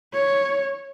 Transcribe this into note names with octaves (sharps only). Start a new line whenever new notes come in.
C#5